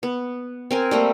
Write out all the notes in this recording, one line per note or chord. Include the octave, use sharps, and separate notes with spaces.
B3
C4 A#4 G#5
G3 A3 A#3